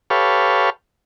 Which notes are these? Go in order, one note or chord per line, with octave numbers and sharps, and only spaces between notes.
G4 A4 B4 C#5 F5